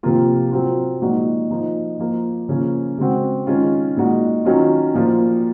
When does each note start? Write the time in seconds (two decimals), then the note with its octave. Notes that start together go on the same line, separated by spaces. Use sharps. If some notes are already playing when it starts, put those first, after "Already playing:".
0.03 C3 F3 A#3 F4
0.52 F#3 C4 F4
1.02 A#2 F3 G#3 D#4 F#4
1.50 F3 A#3 D#4
1.99 F3 A#3 F4
2.49 C#3 F3 A#3 C#4
2.98 C#3 G#3 C4 F#4
3.47 D#3 G#3 C#4 F4
3.97 A#2 G#3 D#4 F#4
4.45 D#3 F#3 C#4 F4
4.94 A#2 F3 A#3 F4